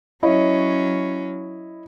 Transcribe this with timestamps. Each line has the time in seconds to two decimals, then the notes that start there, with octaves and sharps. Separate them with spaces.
0.23 F#3 C#4 E4 C#5 D#5